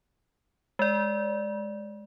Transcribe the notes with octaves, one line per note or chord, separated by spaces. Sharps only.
G#3 D5